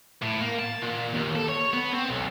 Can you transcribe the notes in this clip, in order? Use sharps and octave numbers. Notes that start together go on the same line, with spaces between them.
A2
A#3
A5
A#2
D#2
A4
C#5
B3
C4
B1